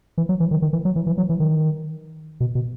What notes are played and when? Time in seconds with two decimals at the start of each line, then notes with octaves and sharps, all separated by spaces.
0.18 E3
0.29 F#3
0.40 E3
0.51 D#3
0.62 D#3
0.73 E3
0.85 F#3
0.96 E3
1.07 E3
1.18 F#3
1.30 E3
1.40 D#3
2.40 B2
2.55 B2